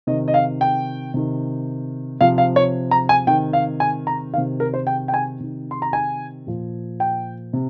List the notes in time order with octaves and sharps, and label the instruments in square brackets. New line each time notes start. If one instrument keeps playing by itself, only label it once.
[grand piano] C3 D#3 D#5
D#5
F5
G5
C3 D#3
C3 F3 F5
F5
C#5
A#5
G#5
C3 D#3 G5
F5
G#5
A#5
D#3 F5
C3
A#4
C5
G5
G5
G#5
C3 D#3
C6
A#5
G#5
A#2 F3
G5
C3